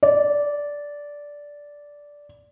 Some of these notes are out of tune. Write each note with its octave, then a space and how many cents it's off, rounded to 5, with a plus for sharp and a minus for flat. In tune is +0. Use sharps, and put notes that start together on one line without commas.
D5 -10